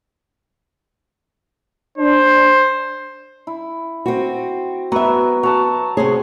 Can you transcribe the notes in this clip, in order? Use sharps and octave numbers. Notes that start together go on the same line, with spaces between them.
D4 C5
E4
C4 F#4
F#3 B3 E5
F#4 A5 A#5
C3 G#4 C5 C#5